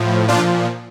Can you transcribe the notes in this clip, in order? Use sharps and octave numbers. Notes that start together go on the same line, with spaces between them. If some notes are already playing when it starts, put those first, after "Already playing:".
Already playing: A2 F3
A#2 F3 D4 F4